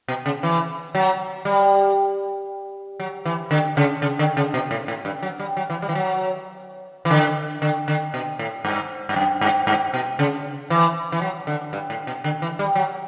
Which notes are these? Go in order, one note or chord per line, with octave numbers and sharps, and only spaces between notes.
B2
C#3
E3
F#3
G3
F#3
E3
D3
C#3
C#3
D3
C#3
B2
A2
A2
G2
F#3
G3
F#3
E3
G3
E3
F#3
E3
D3
D3
D3
B2
A2
G2
G2
F#2
G2
G2
B2
C#3
E3
E3
F#3
D3
G2
A2
B2
D3
E3
G3
F#3